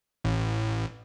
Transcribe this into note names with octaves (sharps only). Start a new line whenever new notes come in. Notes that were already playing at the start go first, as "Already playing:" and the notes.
A1